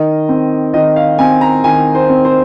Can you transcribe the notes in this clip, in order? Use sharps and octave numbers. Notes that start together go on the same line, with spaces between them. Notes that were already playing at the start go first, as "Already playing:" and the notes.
Already playing: D#3 D#5
C4
D#3 D#5
F5
C4 G#5
A#5
D#3 G#5
C5
C4
C5